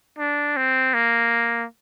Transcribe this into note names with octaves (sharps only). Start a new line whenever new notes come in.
D4
C4
A#3